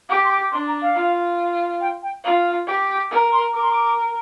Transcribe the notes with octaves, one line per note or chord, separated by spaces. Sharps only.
G4 D6
C6
D6
D4 C6
A#5
F5
F4
G5
G5
F4 F5
G4
A#4
C6
A#4 D6
C6
D6